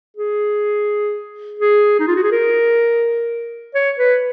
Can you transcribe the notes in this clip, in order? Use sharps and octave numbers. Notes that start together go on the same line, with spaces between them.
G#4
G#4
D#4
F4
F#4
G#4
A#4
C#5
B4